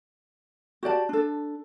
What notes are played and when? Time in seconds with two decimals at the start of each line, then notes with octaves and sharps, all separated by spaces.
0.83 F#4 G4 D5 A5
1.09 D4 A4